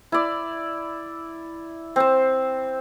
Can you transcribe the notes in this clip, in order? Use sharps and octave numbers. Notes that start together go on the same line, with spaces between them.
E4 D5
C4 C5